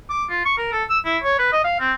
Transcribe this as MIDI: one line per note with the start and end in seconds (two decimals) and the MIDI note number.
0.10 0.25 86
0.30 0.40 65
0.45 0.54 85
0.58 0.68 70
0.72 0.84 69
0.90 0.99 88
1.05 1.18 64
1.23 1.36 73
1.39 1.50 71
1.52 1.64 75
1.64 1.78 77
1.80 1.93 60